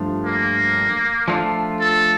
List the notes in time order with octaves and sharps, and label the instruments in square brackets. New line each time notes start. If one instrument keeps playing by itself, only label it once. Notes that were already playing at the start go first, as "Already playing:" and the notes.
Already playing: [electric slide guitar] G2 F3 A3 D4 F4
[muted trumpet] A#3
[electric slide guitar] F3 A3 D4 F4
[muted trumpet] A4